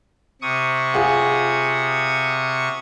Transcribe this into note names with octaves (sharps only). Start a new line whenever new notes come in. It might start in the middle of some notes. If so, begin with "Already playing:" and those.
C3 C#6 D#6
F4 G#4 F#5